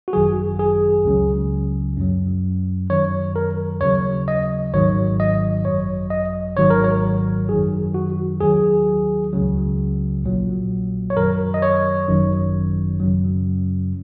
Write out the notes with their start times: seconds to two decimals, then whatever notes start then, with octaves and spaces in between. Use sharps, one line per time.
0.08 F#4
0.13 G#1 F#2 D#3 F#3 G#4
0.59 G#4
1.05 C#2 C#3 F#3
1.98 F#2 F#3
2.90 F#2 D#3 F#3 C#5
3.36 A#4
3.81 D#2 C#3 F#3 C#5
4.28 D#5
4.74 G#1 G#2 D#3 F#3 C#5
5.20 D#5
5.65 G#1 F#2 F#3 C#5
6.10 D#5
6.56 G#1 G#2 D#3 F#3 C#5
6.70 A#4
6.84 C#5
7.49 F#2 D#3 F#3 G#4
7.94 F#4
8.40 D#2 D#3 F#3 G#4
9.33 C#2 C#3 F#3
10.24 A#1 A#2 F#3
11.10 C#5
11.16 F#2 D#3 F#3 A#4
11.54 D#5
11.62 C#5
12.08 G#1 F#2 D#3 F#3
13.00 F#2 C#3 F#3